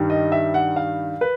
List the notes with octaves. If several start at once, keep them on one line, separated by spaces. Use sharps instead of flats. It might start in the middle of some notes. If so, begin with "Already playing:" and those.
Already playing: G2 D#3 G3
D#5
E5
F#5
F5
B4